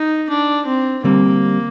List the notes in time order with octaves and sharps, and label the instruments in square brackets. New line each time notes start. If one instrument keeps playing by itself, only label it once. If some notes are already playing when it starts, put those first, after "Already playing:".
Already playing: [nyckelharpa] D#4
D4
C4
[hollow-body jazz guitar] D3 G3 C4 [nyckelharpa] A#3